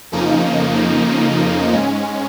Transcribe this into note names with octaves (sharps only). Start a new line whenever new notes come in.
F2 C#3 F3 A#3 D#4
G#2 G#3 C#4